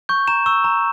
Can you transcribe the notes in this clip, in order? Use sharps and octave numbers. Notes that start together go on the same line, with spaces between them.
C#6 G6
A#5 E7
C#6 E6
A#5